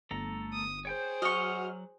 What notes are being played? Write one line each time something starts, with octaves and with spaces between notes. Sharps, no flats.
G1 A3 A4 A#5
D#6
G#4 C5 C#5 G5 G6
F#3 F#4 D#5 C#6 F6